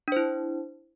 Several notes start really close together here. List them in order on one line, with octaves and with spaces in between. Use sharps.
D4 C5 E4